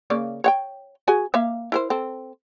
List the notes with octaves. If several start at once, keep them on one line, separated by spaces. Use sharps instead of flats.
C#3 A#3 D5
C#5 F#5 G5
F#4 G#4 G#5
A#3 E5 F5
E4 A#4 C5
C4 A4